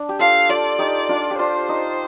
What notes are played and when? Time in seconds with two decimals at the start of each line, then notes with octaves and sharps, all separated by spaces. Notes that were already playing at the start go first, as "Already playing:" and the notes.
Already playing: D4
0.09 G4
0.19 F4 A4 F5
0.49 F4 A4 D5
0.78 D#4 G4
1.09 D4 F4
1.30 G4
1.38 D4 F4 C5
1.69 D#4